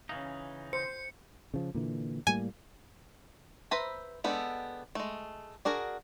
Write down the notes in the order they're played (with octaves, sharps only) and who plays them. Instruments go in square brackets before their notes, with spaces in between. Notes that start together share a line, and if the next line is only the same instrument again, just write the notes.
[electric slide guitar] C#3 E3 D#4 [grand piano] C#4 F5
[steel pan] C5 [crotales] C#7
[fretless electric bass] C#3 F3
A#2 D3 E3
[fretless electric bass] A2 G3 A#3 [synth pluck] G#5
[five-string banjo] B4 C5 E5 A#5 B5
G#3 B3 D4 G4 A4
G#3 A3
D4 F#4 G#4 A#4